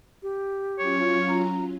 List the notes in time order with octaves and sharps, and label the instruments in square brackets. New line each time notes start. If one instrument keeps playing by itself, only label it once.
[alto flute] G4
[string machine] F#3 C#4 F4 [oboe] C#5
[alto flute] A#5